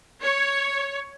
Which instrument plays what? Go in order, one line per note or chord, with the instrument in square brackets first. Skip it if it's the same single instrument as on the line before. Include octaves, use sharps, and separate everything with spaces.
[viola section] C#5